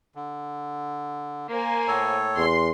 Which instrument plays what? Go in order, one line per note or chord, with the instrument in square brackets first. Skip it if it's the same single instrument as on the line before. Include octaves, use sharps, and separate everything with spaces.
[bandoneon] D3
[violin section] A#3 C5 G#5
[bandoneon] A2 A4 C#5
[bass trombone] E2 [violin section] C6